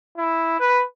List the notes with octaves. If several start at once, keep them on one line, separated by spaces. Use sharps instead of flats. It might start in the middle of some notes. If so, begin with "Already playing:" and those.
E4
B4